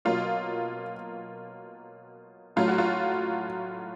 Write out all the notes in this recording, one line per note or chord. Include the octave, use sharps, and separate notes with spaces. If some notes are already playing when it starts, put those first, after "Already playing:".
B2 F#3 A#3 F4
A2 F#3 A3 F4
F#4
F4